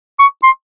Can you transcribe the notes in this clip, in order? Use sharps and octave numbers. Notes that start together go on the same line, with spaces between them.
C#6
C6